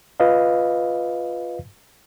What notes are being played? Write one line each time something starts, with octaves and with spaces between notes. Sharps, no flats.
F4 B4 D#5 F5